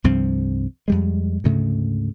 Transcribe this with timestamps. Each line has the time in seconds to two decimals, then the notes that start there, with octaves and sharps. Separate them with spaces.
0.04 C2 G2 F3 C4
0.88 F2 G3 G#3
1.44 D2 G#2 C#3 A3